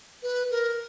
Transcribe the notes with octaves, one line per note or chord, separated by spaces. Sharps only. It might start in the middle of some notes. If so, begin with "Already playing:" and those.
B4
A#4